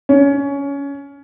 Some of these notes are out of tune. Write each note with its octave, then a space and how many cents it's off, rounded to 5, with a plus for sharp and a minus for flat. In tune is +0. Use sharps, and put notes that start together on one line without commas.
C#4 +20